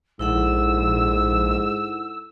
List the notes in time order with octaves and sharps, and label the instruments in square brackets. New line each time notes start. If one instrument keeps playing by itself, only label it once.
[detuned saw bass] A#1 [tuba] G#2 [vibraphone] E4 A4 F#5 [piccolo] E6